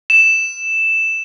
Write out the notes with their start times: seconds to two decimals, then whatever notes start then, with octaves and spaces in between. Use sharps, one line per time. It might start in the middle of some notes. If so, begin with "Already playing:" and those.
0.10 E7